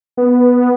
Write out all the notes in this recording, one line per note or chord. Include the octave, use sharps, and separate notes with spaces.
B3